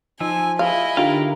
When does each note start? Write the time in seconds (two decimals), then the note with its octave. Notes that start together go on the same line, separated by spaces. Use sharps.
0.20 F3 D#4 G#5 E6
0.59 E4 G#4 D#5 F5
0.97 D3 D#4 F4 G4 A#4 F5